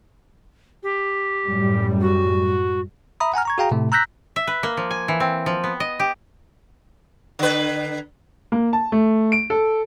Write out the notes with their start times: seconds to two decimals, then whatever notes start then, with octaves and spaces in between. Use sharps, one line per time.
0.83 G4
1.46 F#2 A2 G3
2.01 F#4
3.20 E5 A#5 B5 D#6
3.34 F#5 G#5 A#5 F6
3.45 A#5 C#6 G#6
3.58 F#4 G#4 F5 G5 A#5
3.71 A2 C3 A3
3.92 A#5 E6 F#6 G6 A#6 B6
4.36 E5
4.47 B4
4.63 A#3
4.77 F3
4.91 G#5
5.08 E3
5.20 C4
5.46 F3
5.64 B3
5.80 D#5
6.00 G4
7.39 D3 B4
8.52 A#3
8.73 A5
8.92 A3
9.32 D7
9.50 A4